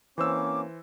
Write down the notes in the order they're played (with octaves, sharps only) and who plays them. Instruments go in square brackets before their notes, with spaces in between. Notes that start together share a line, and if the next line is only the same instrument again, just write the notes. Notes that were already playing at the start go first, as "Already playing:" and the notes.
[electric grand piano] E3 C5 E6 [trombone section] A#3 C4 C#4 [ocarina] D6